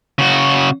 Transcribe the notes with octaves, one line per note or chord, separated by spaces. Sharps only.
C#3 F#4